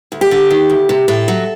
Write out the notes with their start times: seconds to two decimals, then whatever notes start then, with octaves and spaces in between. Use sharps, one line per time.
0.12 D2
0.21 G4
0.31 D3
0.51 D#3
0.70 D2
0.89 C3
1.08 A2 A4
1.28 F#3